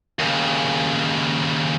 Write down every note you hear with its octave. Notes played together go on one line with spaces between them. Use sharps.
D#2 C#3